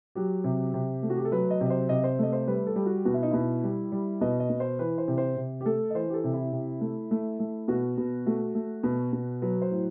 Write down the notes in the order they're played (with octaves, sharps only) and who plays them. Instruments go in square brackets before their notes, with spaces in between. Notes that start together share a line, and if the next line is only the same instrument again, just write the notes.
[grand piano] F#3 G4
C3
C3
A3
F#4
G4
A4
F#3 B4
D#5
C3 D#5
C5
C3 D#5
C5
A3 D#5
C5
G3 B4
A4
G3
F#4
B2 F#4
E4
D#4
B2 E4
G3
G3
B2 D#5
D#5
B2
C5
E3 B4
C5
C3
C5
C3
G4
A3 A4
D#5
E3 C5
G4
A4
C3
E4
C3
A3
A3
A3
B2 F#4
B2
A3 F#4
A3
B2
B2
F#3 B4
C5
A2